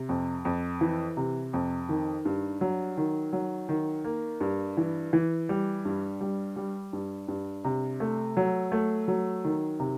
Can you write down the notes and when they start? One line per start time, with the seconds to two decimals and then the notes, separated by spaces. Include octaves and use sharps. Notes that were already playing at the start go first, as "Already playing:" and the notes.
Already playing: C3
0.09 F2
0.45 F2
0.81 E3
1.17 C3
1.53 F2
1.89 D#3
2.25 G2
2.61 F#3
2.97 D#3
3.33 F#3
3.69 D#3
4.04 A#3
4.40 G2
4.77 E3
5.13 E3
5.49 G3
5.85 G2
6.21 G3
6.56 G3
6.93 G2
7.28 G2
7.64 C3
8.00 A3
8.37 F#3
8.72 A3
9.08 F#3
9.44 D#3
9.80 C3